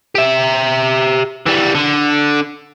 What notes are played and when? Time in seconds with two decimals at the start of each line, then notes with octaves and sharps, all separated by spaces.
0.15 G4 E5
1.46 E3 G3
1.75 D3